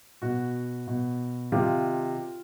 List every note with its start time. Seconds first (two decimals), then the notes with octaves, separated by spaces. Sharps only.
0.22 B2 F#4
0.87 B2
1.52 C3 D#3 F4